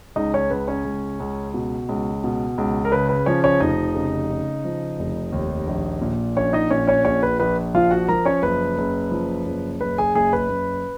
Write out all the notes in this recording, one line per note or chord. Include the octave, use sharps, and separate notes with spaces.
C#2 D#4 D#5
C#4 C#5
C#2 B4
C#4 C#5
C#2
C#2
B2
C#2
B2
C#2
A#4
C#3 B4
B4
F3 C#4 C#5
C#4 C#5
F1 D#4 D#5
C#3
C#3
F3
F1
D#2
A#1
A#2
A#1 C#4 C#5
D#4 D#5
A#2 C#4 C#5
C#4 C#5
A#1 C#4 C#5
B4
A#1 B4
F3 F4 F5
F#4 F#5
F3 A#4 A#5
C#4 C#5
F#1 B4
F#1
F3
F#1
F#1 B4
G#4 G#5
F#1 G#4 G#5
B4 B5
F#1